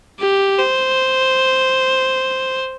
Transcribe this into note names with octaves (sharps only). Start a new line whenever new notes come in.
G4
C5